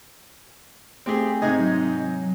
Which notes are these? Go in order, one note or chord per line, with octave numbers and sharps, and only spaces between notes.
A3 C4 G4 G#4
G#2 C3 D#5 G#6
F#3